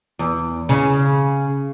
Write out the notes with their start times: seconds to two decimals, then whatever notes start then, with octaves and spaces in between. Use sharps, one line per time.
0.19 E2
0.69 C#3